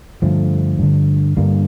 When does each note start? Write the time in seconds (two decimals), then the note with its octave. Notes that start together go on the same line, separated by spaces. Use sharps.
0.22 G2 D3 F3 A3
0.79 G2 D3
1.37 G2 D3 G3 A#3